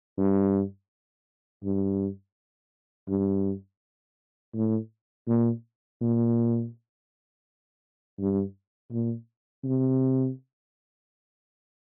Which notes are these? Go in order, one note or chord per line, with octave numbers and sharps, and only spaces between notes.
G2
G2
G2
A2
A#2
A#2
G2
A#2
C3